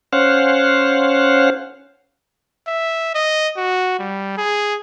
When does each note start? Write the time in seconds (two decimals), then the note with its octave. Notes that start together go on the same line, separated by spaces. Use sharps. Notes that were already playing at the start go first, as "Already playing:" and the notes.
0.13 C#4 C5 F5 F#5
2.67 E5
3.15 D#5
3.57 F#4
3.99 G3
4.37 G#4